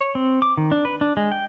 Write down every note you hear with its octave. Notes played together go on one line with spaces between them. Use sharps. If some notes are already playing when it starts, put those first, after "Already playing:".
C#5
C4
D6
D#3
D4
B4
D4
G#3
G5